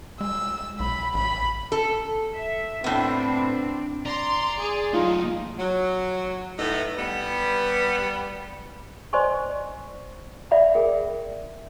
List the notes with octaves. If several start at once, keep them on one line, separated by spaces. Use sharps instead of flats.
G#3 E6
B1 B5
A1 B5
A4
E5
A2 B3 C4 D4
D5 A#5 C6
G#4
F#3 A3 D#4 F4
F#3
A2 A3 B3 D#4
G3 B3
C5 D5 D#5 G#5 C6 C#6
D5 E5 F#5 B5
G#4 A#4 G5